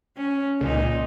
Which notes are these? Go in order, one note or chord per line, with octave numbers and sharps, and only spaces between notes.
C#4
C#2 A#2 D#4